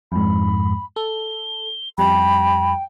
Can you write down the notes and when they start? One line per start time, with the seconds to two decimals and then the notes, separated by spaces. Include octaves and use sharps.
0.12 F2 G#2 B5
0.96 A4 G7
1.98 F2 G3 G5 B5